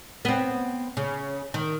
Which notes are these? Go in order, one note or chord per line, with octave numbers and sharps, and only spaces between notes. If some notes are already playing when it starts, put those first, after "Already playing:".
B3 C4
C#3
D#3